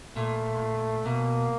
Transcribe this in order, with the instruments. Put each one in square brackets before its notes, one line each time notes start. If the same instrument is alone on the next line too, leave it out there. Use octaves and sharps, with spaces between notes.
[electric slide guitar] A#2 [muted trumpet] A3
[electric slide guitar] B2 [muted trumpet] A#3